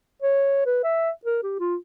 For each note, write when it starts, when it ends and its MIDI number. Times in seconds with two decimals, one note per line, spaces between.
0.22 0.63 73
0.66 0.82 71
0.84 1.10 76
1.25 1.39 70
1.43 1.56 67
1.60 1.76 65